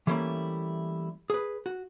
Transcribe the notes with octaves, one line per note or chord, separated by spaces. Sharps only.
E3 G3 A3 A#3 C#4 E4
G#4 B4
F#4